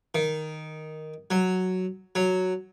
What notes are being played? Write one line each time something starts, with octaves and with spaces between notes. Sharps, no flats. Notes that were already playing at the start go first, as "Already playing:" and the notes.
D#3
F#3
F#3